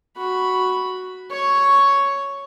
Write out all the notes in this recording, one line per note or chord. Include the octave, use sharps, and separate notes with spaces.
F#4 B5
C#5 C#6